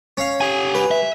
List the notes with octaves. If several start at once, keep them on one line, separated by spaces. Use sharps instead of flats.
C#4 F5
G4 G#5
B4
E5